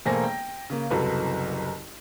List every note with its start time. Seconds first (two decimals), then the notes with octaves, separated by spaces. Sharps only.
0.06 E1 A3 A#3 C5 G#5 A#6
0.24 G5
0.70 C#3 A#3
0.90 F#1 C2 F#3 A4 B4